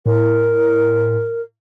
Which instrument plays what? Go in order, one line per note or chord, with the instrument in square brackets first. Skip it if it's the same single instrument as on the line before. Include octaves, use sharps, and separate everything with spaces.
[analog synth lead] A2 [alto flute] A#4